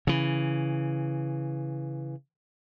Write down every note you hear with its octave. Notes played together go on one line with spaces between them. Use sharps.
C#3 E3